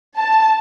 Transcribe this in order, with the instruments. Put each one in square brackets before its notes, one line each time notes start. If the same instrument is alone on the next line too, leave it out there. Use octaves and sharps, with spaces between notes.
[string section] A5